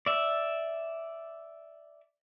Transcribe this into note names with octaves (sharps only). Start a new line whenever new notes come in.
D5 E5